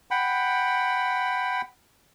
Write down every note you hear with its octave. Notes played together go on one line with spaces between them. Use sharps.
F#5 G5 B5